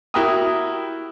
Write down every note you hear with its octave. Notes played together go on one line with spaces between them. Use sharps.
E4 F#4 G4 A#4 G5 D#6